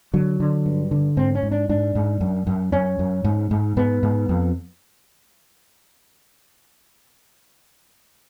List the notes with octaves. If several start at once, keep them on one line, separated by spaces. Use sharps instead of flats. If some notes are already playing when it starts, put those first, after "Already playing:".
D3 F#3
D3
G2
D3
G#2 C4
C#4
G#2
D4
G#2 D4
G#2
F#2
F#2
F#2 C#4
F#2
G#2
G#2
G#2 B3
G#2
F2